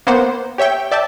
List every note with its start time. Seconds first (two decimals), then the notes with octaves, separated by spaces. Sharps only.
0.07 A#3 B3 C5 F#5
0.58 G4 C#5 E5 G5
0.91 D5 E5 G5 A5